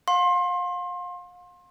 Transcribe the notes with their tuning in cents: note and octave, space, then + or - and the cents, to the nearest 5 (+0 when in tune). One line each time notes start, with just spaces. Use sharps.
F5 +40 C6 +30